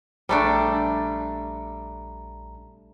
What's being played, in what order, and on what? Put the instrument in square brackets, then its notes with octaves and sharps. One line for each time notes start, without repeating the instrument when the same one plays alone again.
[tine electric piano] A#1 A#5 [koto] G3 A3 D4